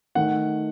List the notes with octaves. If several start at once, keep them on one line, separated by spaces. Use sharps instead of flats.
D#3 A3 F#5